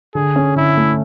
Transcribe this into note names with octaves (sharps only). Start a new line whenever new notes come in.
D3 G#4
C#4
D3 E4
A3